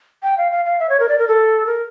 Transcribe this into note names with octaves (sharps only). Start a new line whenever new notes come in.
G5
F5
F5
F5
E5
C#5
A#4
D5
A#4
A4
A#4